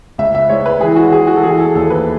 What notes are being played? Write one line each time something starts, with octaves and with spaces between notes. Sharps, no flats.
C#2 E5
E5
G#3 C#5
B4
E3 G#4
F#4
E3 G#4
F#4
A4
E3 G#4
A4
D#2 A4
B4